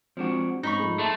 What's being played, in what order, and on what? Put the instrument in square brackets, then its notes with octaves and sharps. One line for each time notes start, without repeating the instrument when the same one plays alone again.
[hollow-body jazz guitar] F3 D4 F#4 [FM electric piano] G#3 C4
[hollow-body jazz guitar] G#2 [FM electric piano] C4 C#4 [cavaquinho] D#4 B5 C#6
[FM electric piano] F3 A3 G#4
[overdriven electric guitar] A3 [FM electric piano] C6 A6